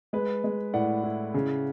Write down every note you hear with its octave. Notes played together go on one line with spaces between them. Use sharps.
G#3 B4
G#3
A2 D5 F#5
E4
C#3